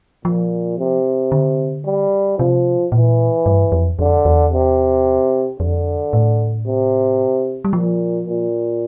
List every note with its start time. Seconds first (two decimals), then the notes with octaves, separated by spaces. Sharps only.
0.25 A#2 F3
0.78 C3
1.32 D3
1.85 G3
2.38 C3 F3
2.92 A#2 E3
3.46 G2
3.72 F2
3.99 F2 D3
4.25 E2
4.52 C3
5.60 F2 D3
6.13 A2
6.66 C3
7.65 G3
7.73 A#2 F3
8.27 A#2